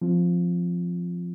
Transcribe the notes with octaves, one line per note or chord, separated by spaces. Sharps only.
F3 C4 F4